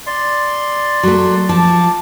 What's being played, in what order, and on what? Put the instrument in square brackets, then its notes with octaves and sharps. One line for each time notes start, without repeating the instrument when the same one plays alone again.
[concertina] D5 C6
[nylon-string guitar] F#3 A3
[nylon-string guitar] F3 [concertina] A5 D6